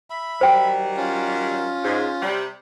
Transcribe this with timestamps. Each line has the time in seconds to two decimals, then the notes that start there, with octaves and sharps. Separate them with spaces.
0.10 E5 B5
0.41 D#3 F#3 G3 C5 G5
0.97 C#4 F4
1.83 G#2
2.21 C3 G3